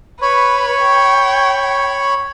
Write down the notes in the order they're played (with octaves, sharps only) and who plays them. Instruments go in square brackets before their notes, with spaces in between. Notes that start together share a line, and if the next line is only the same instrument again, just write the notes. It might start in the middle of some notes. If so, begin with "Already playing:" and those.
[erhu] B4 [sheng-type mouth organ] C#5 B5 C#6
[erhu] G5